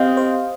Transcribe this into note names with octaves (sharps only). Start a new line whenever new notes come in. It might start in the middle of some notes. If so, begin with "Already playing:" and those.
Already playing: C4 G4 D#5 F5
C5